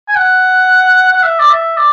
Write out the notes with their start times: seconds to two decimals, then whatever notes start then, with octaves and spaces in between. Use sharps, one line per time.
0.08 G#5
0.15 F#5
1.12 F#5
1.22 E5
1.39 D5
1.50 E5
1.77 D5